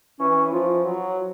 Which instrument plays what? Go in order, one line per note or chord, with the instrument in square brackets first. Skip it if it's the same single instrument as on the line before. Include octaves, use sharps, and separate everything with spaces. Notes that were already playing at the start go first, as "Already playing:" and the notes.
[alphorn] E3 [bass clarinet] C#4
[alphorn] F3 [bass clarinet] F4
[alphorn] F#3